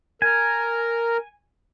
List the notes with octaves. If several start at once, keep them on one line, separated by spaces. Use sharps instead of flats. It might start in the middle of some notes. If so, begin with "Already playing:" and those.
A#4 G#5